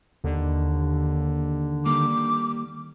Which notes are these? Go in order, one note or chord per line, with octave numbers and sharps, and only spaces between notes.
D#2 D3
D#3 G3 A#3 D6